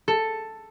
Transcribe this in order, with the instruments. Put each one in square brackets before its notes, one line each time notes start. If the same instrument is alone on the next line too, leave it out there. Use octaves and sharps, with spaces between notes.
[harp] A4